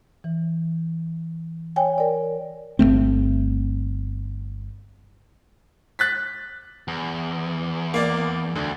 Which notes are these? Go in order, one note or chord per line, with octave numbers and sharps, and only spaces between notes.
E3
C#5 G5 G#5
A#4 D5
G1 G2 A3 C4
F#6 A6 B6
E2
A#3 D5
D2 D3